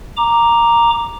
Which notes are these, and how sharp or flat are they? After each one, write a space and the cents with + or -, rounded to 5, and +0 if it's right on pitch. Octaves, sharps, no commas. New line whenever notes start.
A#5 +0 D6 +0